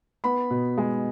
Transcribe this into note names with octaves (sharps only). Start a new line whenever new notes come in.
B3 B5
B2
G#3